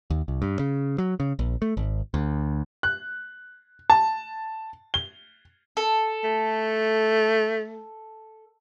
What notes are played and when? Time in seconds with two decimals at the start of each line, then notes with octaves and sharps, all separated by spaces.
0.10 D#2
0.28 C2
0.42 G2
0.59 C#3
0.98 F#3
1.20 C#3
1.39 A#1
1.62 A3
1.77 G#1
2.14 D2
2.83 F#6
3.90 A5
4.94 G7
5.77 A4
6.24 A3